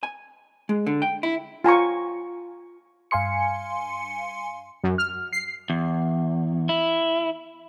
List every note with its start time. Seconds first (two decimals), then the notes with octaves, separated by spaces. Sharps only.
0.03 G#5
0.69 G#3
0.86 D3
1.02 G5
1.23 E4
1.64 F4 G#5 A#5 C#6
3.11 G2 F5 G#5 C6 C#7
4.83 F#2
4.98 F6
5.33 C7
5.70 E2
6.69 E4